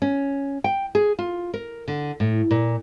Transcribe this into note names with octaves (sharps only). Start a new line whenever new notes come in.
C#4
G5
G#4
F4
A#4
D3
A2
A#2